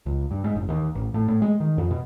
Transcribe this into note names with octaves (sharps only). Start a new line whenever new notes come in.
C#2
G2
G#2
F#1
D#2
A1
A2
A2
G#3
D#3
F2
B2